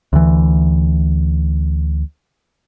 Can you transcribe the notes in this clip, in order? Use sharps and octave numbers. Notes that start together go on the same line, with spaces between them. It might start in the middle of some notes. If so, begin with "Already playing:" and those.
D2 E3